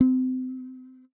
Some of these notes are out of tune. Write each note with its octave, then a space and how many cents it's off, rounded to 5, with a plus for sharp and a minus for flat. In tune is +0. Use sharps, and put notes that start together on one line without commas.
C4 -30